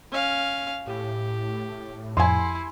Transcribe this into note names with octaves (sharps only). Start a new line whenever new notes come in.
C#4 F5
A2 G4
F2 E4 G#5 C6